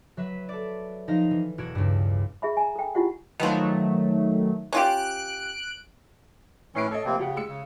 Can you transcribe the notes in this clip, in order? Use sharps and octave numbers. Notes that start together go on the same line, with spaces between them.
F#3 B4 E5
A4 D5
F3 D#4 D#5 F5
E3
E1 F#4 G#6 D7 E7
C#2 G2
G#4 E5 B5
G#5 A#5
A4 G5
E4 F4 G4 F#5
B2 D#3 F3 F#3 A3
C#4 F4 G4 F#6 D7
A2 E3 C#4 C7 D7
A4 C#5 D#5
F1 C3 A#3 C4
C#3 G4 F#5
G#3 E6 C#7
C#3